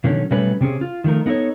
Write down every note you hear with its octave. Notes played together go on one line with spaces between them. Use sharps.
B2 D3 D#3 F#3 C#4
B2 F#3 G3 A3 C#4 B4
C3 C4 C#4 G#4
F4
D#3 F3 A3 A#4
B3 D#4 E4 A4 C#5